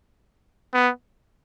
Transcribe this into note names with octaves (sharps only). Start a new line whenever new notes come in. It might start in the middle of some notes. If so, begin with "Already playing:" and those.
B3